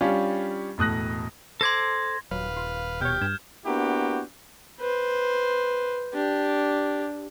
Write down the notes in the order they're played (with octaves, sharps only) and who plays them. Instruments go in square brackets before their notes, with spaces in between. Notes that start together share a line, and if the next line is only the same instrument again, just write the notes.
[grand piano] G3 C#4 D4 F4 G4
E1 A2 D#6 F#6 A#6
[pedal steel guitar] A4 C5 D6 [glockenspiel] C6 G#6 A#6
[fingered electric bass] D#1 [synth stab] F#3 [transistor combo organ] B4 F5
[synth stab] F4
[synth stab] B2 C#5 [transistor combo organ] G4 [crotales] F6 G6
[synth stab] G2 [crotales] G#6 E7
[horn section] A#3 B3 D4 E4 F#4 G4
[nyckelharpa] B4 C5
D4 G4